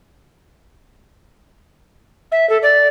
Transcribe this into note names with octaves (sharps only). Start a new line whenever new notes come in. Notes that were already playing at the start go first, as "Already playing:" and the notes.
E5
A4
D5